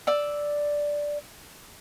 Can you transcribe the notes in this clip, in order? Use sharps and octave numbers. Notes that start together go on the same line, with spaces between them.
D5 E6